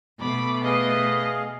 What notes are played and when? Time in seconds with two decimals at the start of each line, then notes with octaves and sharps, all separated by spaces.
0.20 B2 A3 B5 D6
0.64 G#4 B4 D#5 F5